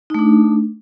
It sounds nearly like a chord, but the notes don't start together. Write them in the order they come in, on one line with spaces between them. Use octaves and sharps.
D#4 A3 D4